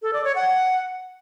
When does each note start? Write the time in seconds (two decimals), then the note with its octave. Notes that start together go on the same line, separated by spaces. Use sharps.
0.02 A4
0.13 D5
0.24 C#5
0.36 F#5